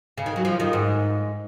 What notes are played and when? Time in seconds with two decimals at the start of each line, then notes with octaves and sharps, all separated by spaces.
0.18 C#3
0.26 D#3
0.36 F#3
0.45 F3
0.60 D#3
0.73 G#2